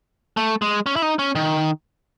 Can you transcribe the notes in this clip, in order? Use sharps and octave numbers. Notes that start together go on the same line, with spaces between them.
A3
G#3
C#4
E4
D#4
C#4
D#3